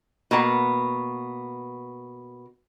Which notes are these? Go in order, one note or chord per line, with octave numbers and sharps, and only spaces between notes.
B2 A#3 B3 F#5